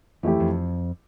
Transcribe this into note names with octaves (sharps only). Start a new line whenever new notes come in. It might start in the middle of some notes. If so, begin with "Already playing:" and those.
F2 E3 A3 E4 G4
F2